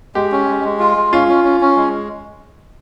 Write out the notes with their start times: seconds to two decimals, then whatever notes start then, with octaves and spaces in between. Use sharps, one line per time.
0.15 G#3 G4
0.32 C#4
0.48 G#3
0.64 G#3
0.80 F4
0.97 G#3
1.13 C#4 F4
1.28 C#4
1.44 C#4
1.61 C#4
1.76 G#3